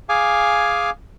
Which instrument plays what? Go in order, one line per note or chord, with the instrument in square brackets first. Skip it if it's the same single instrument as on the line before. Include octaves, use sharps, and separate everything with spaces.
[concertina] G#4 F5 G#5 D6